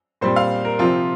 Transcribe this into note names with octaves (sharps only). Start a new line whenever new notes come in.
A#2 G3 C4 C5
F5
A#4
C3 F3 C4 F4